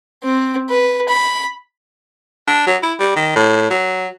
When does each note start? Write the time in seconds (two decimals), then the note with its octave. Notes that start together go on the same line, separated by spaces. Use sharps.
0.24 C4
0.70 B4
1.08 B5
2.47 D4
2.66 F#3
2.83 E4
2.99 G3
3.16 D#3
3.36 A2
3.70 F#3